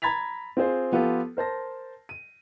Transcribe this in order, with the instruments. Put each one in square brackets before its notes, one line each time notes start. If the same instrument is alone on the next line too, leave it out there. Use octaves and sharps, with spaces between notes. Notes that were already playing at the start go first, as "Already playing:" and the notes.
[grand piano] A#5 B5 G#6 A6 B6 F7
C4 F4 G#4 C5
F3 B3 F4 G4 A4
A#4 C5 A5 A#6
D#7